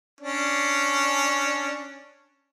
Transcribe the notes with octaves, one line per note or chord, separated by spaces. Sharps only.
C#4 D4